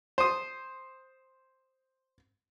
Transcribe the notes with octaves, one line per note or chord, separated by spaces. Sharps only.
C5 D#6